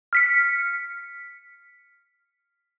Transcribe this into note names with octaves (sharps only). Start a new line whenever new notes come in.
F6 B6 C#7